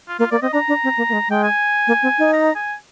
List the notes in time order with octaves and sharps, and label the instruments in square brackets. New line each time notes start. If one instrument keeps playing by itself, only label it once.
[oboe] F4
[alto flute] A#3 [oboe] F4
[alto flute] A#3 [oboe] D5
[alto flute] C4 [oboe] D#5
[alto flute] D4 [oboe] A#5
[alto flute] D4
C4
A#3
A#3
G#3
[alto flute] G#3 [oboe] G5
[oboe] G#5
[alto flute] A#3
C4
D#4
[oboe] A#5
G#5